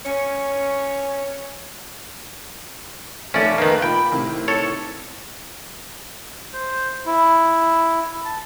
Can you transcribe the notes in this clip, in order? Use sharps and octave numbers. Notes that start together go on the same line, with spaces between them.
C#4 C#5
F1 D#2 A3 C#4 D5 E5
D#3 A#3 B4
A#2 G5 B5
A2 C3 D#3 E4
A4 C#5
C5
E4
A5